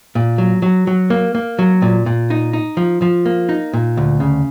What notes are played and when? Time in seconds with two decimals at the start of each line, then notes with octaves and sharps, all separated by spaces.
0.15 A#2
0.38 F#3
0.62 F#3
0.87 F#3
1.10 A#3
1.35 A#3
1.59 F#3
1.82 A#2
2.06 A#2
2.30 D#4
2.53 D#4
2.77 F3
3.02 F3
3.25 A#3
3.49 D#4
3.73 A#2
3.97 D2
4.20 C#3